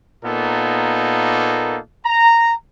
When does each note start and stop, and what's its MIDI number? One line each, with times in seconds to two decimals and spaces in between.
0.24 1.79 46
0.24 1.79 58
0.24 1.79 59
0.24 1.79 63
0.24 1.79 69
2.05 2.53 82